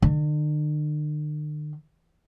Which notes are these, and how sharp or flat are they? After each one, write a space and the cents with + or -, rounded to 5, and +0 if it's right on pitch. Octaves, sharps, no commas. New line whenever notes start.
D3 +45